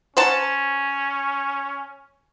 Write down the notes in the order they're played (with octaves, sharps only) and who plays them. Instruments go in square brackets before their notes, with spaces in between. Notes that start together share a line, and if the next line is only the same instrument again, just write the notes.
[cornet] C#4 [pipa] C5 F#5 A5